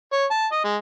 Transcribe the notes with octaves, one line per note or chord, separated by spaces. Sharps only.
C#5
A5
D#5
G#3